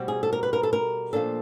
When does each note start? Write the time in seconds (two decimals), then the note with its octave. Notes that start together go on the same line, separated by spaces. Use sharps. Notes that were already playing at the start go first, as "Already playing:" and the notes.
Already playing: B2 G3 C4
0.08 G#4
0.23 A4
0.33 A#4
0.43 B4
0.53 A#4
0.63 A4
0.73 A#4
1.13 A#2 F3 A#3 D4 A4